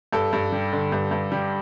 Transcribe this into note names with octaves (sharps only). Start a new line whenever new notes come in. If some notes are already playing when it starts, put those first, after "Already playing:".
G2 A4
G2
G3
D3
G2
G2
G3